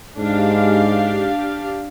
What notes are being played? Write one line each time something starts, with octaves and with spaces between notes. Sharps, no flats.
G#2 D4 G4 F5